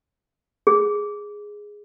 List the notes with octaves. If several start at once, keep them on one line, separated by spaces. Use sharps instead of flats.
G#4